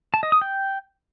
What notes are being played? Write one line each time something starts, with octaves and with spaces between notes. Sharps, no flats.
A5
D#5
D#6
G5